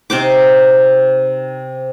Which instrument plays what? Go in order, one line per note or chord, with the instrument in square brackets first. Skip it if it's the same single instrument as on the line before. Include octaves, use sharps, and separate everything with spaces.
[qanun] C3 D#4 C5 D6